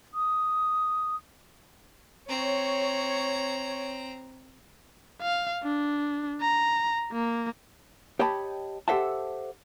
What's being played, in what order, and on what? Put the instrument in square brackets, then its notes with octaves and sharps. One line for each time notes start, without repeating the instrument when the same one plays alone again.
[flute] D#6
[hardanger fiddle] C4 A#5 [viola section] C#5
[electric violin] F5
D4
A#5
A#3
[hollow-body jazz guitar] G4 C#5 D#5 G5 A5 B5
G4 A4 C5 E5 F#5 A5